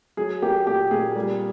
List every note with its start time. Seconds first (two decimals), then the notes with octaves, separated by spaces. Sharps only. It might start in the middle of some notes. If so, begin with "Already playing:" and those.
0.17 F#3 G#4
0.42 A#3 G4
0.67 A#2 G4
0.91 A#2 G#4
1.16 G3